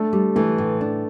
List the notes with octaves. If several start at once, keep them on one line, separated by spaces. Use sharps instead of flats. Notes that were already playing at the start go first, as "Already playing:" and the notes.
Already playing: A3 D4
G3
E3 A3
A2
D4